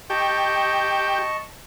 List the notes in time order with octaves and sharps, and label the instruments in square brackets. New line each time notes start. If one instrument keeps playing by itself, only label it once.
[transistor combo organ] G4 [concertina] D#5 A5 C#6